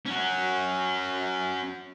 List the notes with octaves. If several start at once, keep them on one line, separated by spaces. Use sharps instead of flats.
C#4 F#4